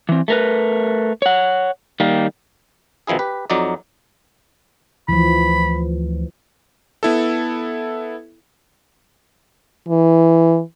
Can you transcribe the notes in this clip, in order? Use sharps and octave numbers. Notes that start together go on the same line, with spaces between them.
E3 C4
A3 A#4 B4
C#5 F#5
D#3 G3 A#3
B2 D#3 F3 E4 G#4
G4 B4
F2 F#3 D#4 D5
D2 E3 F3 B5
B3 E4 A4
E3